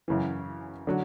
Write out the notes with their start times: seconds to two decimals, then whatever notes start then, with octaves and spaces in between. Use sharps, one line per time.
0.08 F#2 C#3 E3
0.87 D3 F#3